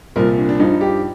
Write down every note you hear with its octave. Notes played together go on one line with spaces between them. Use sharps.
C2 A#2 F3 A#4
D4
D4
G2 F3 D#4
G4